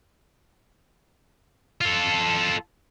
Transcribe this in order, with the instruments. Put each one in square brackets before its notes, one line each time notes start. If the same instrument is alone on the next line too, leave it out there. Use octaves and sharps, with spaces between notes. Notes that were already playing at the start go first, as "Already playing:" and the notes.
[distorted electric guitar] F4 A4